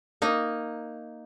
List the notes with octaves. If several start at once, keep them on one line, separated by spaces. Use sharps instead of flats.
A#3 D#4